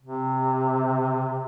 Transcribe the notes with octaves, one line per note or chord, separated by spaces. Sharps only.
C3